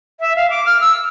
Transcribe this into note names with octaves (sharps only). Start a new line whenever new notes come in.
E5
F5
D6
F6
E6